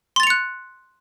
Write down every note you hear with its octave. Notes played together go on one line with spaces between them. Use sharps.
C6 F#6 A6 C#7 F7